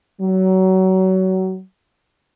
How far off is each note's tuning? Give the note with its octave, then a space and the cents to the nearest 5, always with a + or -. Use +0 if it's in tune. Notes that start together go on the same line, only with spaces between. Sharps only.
F#3 +25